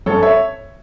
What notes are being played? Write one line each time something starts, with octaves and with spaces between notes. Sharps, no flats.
F#2 A4 C#5
C#5 E5